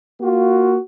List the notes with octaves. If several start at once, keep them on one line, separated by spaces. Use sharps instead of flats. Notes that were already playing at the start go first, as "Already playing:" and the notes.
A#3 F4 F#4